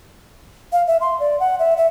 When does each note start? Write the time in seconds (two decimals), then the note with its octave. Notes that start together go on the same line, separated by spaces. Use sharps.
0.72 F5
0.87 E5
1.01 C6
1.20 D5
1.40 F#5
1.59 E5
1.77 E5